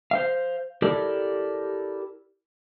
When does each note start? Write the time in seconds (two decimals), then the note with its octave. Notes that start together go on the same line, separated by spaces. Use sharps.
0.11 C5 F5
0.82 E4 G4 A4 A#4 D5